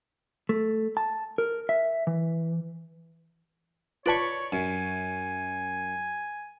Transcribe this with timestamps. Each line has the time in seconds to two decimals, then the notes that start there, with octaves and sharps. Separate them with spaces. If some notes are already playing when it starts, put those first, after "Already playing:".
0.49 A3
0.97 A5
1.38 A#4
1.69 E5
2.07 E3
4.06 F4 B4 C#5 D5 A5 B5 C#6
4.52 F#2 G#5